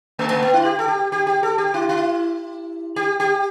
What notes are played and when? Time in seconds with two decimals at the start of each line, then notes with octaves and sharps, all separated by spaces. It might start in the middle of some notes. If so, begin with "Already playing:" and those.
0.19 A3
0.30 A3
0.42 B3
0.54 E4
0.65 G4
0.79 A4
0.88 G4
1.12 G4
1.27 G4
1.43 A4
1.58 G4
1.74 E4
1.89 E4
2.96 G4
3.20 G4